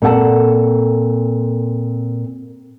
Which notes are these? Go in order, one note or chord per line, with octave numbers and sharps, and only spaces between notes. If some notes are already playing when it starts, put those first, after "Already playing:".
A#2 C4 A4 F#5 A5